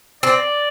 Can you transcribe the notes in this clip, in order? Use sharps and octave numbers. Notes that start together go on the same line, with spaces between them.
C4 D5